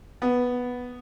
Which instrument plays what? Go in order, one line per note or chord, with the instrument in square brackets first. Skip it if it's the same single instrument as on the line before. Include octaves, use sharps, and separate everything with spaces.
[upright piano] B3